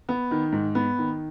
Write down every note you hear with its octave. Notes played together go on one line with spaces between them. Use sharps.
B3
D#3
G#2
B3
D#3